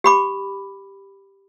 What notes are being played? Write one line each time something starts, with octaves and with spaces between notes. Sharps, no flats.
G4 B5 D6